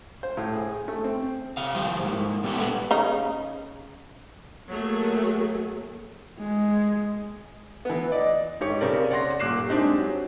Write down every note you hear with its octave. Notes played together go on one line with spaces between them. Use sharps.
C5
A2
G#4
A3
C4
C3 F5
F3 G3 C5
G#2 A#3
B2 G3 G#3 B3 G4 A4
A#2 D4 A4 B4 D5 F#5
C#3 D#4
F#3 A3 A#3 G#4
G#3
E3 B3
D5 D#5
G#2 G4 C#5 C#6
C#3 C4 A#4 D5
C#5 D5 F#5 C6 A#6
D#1 A#2 D6 F#6 C7 E7
G#3 C4 D4 D#4 G4
F#3